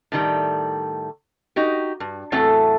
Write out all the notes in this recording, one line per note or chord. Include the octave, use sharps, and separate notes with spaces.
A2 D#3 G3
D#4 F#4 G4
G2
E2 A2 F#3 A3 C4 A4